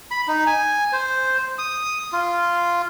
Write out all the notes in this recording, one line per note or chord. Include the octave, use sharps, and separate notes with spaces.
B5
D#4
G#5
C5
D#6
F4